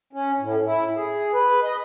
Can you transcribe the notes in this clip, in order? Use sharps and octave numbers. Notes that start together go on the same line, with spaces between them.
C#4
A2
E4
G#4
B4
D#5